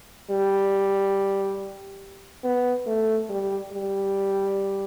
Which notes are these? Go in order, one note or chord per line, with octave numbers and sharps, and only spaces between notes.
G3
B3
A3
G3
G3